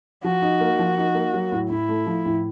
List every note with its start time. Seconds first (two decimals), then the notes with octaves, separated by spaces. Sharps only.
0.24 F3 F#4
0.42 D#4
0.61 A#3
0.79 F3
0.98 D#4
1.15 A#3
1.34 F#3
1.52 A2
1.70 A2 E4
1.89 A3
2.06 F3
2.25 A2